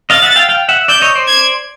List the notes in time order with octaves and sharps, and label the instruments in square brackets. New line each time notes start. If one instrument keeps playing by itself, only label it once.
[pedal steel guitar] D#5 F5 [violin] A6
[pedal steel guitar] E5 F#5
F5 G5
F5 G5
E5 F#5
[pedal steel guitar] D5 E5 [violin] G6
[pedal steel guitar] C#5 D#5
C5 D5
[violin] G#6